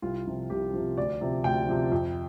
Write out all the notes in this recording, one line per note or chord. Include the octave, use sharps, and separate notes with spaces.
C2 F4
C3 F3
C2 G4
C3 F3
D2 D5
C3 F3
D2 G5
C3 F3
F2